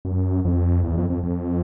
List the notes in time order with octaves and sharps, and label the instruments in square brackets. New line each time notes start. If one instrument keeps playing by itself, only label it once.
[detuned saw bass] F#2
F2
E2
F2
F2
F2